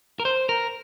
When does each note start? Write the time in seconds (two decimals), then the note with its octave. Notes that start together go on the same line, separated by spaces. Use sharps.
0.20 A#4
0.25 C5
0.49 A#4